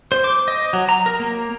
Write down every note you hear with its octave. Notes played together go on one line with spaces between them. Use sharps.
C5
D6
D#5
F#3
A#5
A#4
A#3